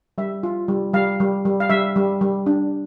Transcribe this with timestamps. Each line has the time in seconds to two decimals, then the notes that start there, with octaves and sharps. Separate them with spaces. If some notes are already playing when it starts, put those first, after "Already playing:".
0.18 G3 E5
0.43 F4
0.68 G3
0.93 G3 F5
1.20 G3
1.45 G3
1.60 F5
1.70 G3 E5
1.96 G3
2.21 G3
2.46 D4